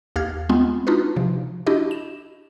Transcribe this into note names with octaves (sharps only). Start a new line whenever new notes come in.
D#2 G4 F5 F6 G#6
G#3 B3 C4 F4
D4 D#4 F4 F#4 B4
C3 F3
D4 E4 F#4 G4 D#5
E7